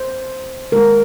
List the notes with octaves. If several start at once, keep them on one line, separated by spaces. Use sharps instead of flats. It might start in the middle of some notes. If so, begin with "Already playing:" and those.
Already playing: C5
D#3 G#3 A#4